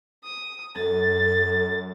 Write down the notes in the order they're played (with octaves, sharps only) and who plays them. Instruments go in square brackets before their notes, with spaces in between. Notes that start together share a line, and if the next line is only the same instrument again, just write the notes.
[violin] D#6
[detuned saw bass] F#2 [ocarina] A4 [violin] A6